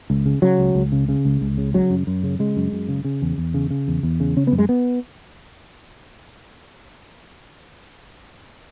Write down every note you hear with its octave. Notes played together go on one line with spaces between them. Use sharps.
C#2
C#3
C#3 F#3
C#2
C#2
C#3
C#3
C#2
C#2
C#3
C#3 F#3
F#2
F#2
C#3
C#3 G#3
F#2
F#2
C#3
C#3
E2
E2
C#3
C#3
E2
E2
C#3
C#3 C#4
F#2 B3
G#3
B3